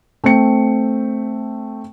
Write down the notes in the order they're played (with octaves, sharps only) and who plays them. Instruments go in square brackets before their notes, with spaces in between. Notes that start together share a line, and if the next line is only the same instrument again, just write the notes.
[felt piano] A3 C4 G5 C#7